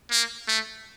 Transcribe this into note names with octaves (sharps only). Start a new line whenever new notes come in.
A#3
A3